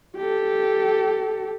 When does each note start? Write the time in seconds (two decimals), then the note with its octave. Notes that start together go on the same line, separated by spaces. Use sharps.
0.17 G4 A4